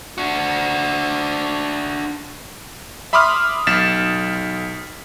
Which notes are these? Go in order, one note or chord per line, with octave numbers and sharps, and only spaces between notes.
D4 F#4
E5 B5 C6 D6 D#6 F6
B1 A6 B6 E7